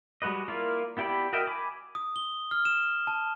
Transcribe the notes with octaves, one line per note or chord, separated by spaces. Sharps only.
G3 G#3 F#4 B4 D#5
A#3 E4 F4 A#4 D5
B3 E4 G4 D5 B5
F#4 A#4 D#5 E5 G5
G#5 B5 D6
D#6
G7
F6
E7
A5